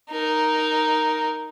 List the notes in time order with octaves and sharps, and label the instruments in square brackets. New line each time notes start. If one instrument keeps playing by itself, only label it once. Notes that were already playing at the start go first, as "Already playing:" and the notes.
[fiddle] D#4 A#4